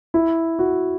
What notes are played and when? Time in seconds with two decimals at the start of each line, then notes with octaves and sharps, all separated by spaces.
0.14 E4
0.59 F#4